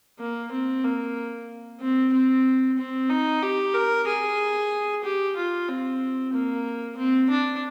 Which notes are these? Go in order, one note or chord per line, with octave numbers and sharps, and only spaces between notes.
A#3
C4
A#3
C4
C4
C4
D#4
G4
A#4
G#4
G4
F4
C4
A#3
C4
D4